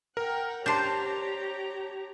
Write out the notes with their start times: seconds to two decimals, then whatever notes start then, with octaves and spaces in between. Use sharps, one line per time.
0.17 A#4 F#5 G5
0.66 D4 G4 C5 C#5 A5 A#5 G6